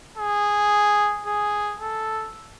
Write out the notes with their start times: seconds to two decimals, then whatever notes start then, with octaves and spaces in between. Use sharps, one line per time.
0.17 G#4
1.26 G#4
1.80 A4